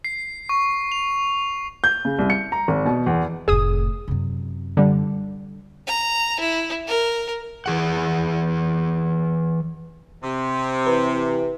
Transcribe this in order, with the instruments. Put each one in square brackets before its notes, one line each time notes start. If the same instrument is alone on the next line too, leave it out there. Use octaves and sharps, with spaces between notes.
[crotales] C7
C#6
F7
[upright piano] G6
C#3
C2
C#7
A#5
G#1
B2
E2
[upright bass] F1 A2 [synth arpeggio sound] G#4 D#6
[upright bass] F#2 C3
[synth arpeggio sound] D3 G3
[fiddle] A#5
E4
A#4
[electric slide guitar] E3 G#4 F#5
[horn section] C3
[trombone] E3 [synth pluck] B4